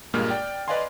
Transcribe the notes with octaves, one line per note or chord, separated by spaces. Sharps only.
G2 A#2 G#3 A#3 F6
D5 G5
B4 D5 D#5 F5 G#5 C6